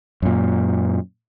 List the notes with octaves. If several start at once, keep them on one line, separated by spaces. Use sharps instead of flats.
F#2 A#2